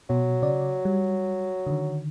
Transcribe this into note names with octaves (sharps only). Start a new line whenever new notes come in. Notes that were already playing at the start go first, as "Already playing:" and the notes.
B2 F#3
C#3 D5
G3
D3 D#3